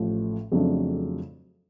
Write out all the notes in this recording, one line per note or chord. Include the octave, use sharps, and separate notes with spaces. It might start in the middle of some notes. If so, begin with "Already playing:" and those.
Already playing: A1 A2 F3
F2 C#3 F#3 A3 D4